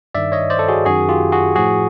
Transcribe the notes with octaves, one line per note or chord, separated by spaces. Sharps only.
G2 D#3 D5 E5
C#5 D#5
C5 D5
A4
F#4 G#4
F#2 D#3 F#4 G#4
F4 G4
F#4 G#4
A2 F3 F#4 G#4